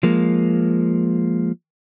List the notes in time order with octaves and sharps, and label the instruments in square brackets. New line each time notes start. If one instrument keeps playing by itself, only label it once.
[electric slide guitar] F3 G#3 A#3